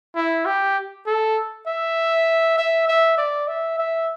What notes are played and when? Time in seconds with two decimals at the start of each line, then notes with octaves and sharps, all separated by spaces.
0.16 E4
0.46 G4
1.07 A4
1.67 E5
2.58 E5
2.88 E5
3.18 D5
3.48 E5
3.79 E5